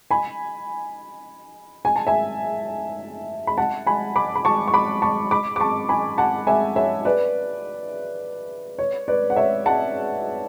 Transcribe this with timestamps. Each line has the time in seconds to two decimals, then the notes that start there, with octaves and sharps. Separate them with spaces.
0.11 G#5 B5
1.85 G#5
1.96 A5
2.07 E5 G#5
3.47 B5
3.58 F#5 A5
3.86 G#5 B5
4.16 B5 D6
4.35 B5
4.45 A5 C#6
4.68 C#6
4.74 B5 D6
5.02 A5 C#6
5.31 B5 D6
5.56 D6
5.60 A5 C#6
5.89 G#5 B5
6.18 F#5 A5
6.47 E5 G#5
6.76 C#5 E5
7.05 B4 D5
8.79 C#5
9.08 B4 D5
9.30 F#5
9.36 C#5 E5
9.66 F#5 A5